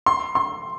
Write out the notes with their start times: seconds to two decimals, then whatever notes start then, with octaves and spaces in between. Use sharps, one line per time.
0.06 C6
0.35 C6